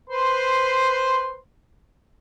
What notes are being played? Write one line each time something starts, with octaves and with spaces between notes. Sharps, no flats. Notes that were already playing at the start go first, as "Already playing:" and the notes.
B4 C5 C6